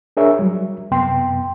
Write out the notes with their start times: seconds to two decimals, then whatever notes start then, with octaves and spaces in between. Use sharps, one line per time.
0.17 D4 G#4 A#4 C#5 E5
0.39 F#3 G3
0.91 F#2 C3 B3 G5 C6